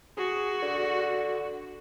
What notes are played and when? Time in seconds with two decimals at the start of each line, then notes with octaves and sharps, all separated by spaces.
0.17 F#4 G#4
0.63 D3